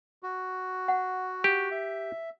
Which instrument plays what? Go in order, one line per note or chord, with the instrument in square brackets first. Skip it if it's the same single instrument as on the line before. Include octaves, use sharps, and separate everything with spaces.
[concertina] F#4
[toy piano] F#5
[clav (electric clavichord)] G4
[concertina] E5